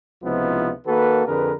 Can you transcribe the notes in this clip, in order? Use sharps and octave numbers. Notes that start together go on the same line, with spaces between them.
C#2 C3 F3 B3 D#4 E4
D#3 A#3 F#4 A4 B4
F2 D3 G#4 A#4 B4